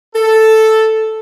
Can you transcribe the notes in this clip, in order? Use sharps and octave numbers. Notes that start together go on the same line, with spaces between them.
A4